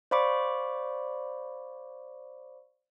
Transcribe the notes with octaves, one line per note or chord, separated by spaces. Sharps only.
C5 D5 F5 B5 C#6 D6